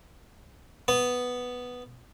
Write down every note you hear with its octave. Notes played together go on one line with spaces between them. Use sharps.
B3